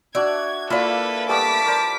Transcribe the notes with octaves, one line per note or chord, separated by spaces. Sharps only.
D4 F#4 D5 E5 G#6
A#3 E4 F4 A4 B4 D5 B5
G3 A3 B3 A5 D6 B6
A#4 C5 D5